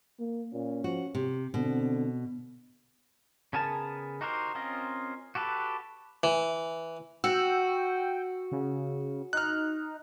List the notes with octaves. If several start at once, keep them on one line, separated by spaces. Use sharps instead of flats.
A#3
A#2 C#4
F3 F#4
C3 G4
B2 D3 C4
C#3 B3 G#4 A#4 A5
D#4 F#4 G4 A#4 C5
C4 C#4 F4 A#4 D#5
F#4 G4 A4 B4
E3
F#4 G5 E6
C#3
D#4 F6 F#6